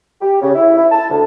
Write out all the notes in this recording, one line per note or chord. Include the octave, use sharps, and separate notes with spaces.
G4
C#3
E4
E4
A5
D2